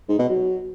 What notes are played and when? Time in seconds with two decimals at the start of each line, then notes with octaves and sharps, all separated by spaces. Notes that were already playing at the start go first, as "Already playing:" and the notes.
0.08 G#2
0.19 B2
0.29 F#3